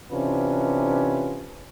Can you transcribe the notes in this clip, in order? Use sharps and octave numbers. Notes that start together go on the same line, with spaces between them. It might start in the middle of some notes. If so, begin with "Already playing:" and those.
C3 E3 C#4 D4 F4 B4